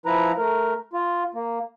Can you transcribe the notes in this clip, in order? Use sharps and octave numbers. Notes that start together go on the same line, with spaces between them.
F3 E4 B4 A#5
A3 A#4
F4
A#3